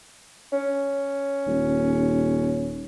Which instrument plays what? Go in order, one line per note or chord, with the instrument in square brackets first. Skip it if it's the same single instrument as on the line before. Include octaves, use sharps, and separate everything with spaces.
[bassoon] C#4
[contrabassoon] D#1